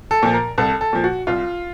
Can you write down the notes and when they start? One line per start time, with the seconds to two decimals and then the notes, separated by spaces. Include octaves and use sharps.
0.11 A4
0.23 A#2 F3
0.34 A#4
0.58 C2 A4
0.81 A4
0.93 A#2 F3
1.04 F#4
1.27 C2 F4